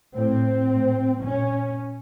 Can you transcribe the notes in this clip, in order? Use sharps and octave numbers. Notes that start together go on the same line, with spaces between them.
A2 C4
A2
A#2 C#4